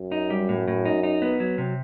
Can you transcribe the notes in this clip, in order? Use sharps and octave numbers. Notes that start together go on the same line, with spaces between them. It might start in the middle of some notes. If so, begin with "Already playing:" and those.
Already playing: F#2
D#4
G3
A2
A2
D#4
D#4
B3
F#3
C3